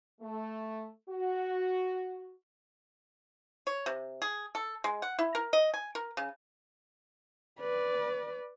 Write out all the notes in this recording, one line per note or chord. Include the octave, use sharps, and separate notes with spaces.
A3
F#4
C#5
C3
G#4
A4
G#3
F#5
E4
A#4
D#5
G#5
A#4
C#3
B4 D5